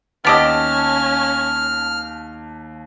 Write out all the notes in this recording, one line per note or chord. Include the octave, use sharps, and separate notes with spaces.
D#2 B3 C#4 G4 D#5 A5 E6 F6